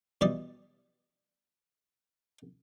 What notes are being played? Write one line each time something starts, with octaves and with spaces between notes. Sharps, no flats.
B2 E3 G3 D5 C#6 D#6